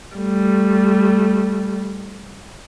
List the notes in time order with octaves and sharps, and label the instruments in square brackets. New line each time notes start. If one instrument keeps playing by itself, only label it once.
[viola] G3 A3